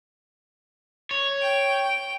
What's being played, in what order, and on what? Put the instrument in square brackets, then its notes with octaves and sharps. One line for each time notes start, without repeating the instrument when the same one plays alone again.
[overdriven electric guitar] C#5
[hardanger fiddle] G5